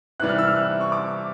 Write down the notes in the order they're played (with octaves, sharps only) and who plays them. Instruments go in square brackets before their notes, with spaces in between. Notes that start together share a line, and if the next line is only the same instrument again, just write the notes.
[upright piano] C3 E3 G3 F#6
F6
E6
F6
F#6
C#6
D6